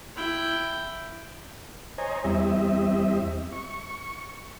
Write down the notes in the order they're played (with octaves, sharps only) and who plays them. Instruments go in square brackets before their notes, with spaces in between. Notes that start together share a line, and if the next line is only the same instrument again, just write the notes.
[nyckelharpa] E4 G5
[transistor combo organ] C5 C#5 D#5 G#5 A#5
E2 G3 C4 D#5 E5
C#6